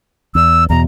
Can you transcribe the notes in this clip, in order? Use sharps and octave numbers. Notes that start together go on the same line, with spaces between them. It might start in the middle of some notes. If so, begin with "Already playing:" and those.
E2 E6
E2 B2 A#5